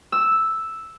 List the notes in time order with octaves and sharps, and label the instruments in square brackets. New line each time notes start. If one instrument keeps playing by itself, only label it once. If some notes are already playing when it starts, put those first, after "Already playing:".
[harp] E6